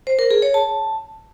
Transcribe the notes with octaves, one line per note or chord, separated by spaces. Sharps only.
C5
A#4
G#4
C#5
A5